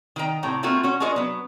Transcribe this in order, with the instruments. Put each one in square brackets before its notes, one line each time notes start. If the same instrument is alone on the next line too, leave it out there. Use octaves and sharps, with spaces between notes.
[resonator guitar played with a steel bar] D#3 G5 A#5
A2 C3 G5 A#5
A3 A#3 C4 F4 F#4 A#4
C#4 F#4
C#4 D4 F4 G#4 A#4 D#5
F#3 B3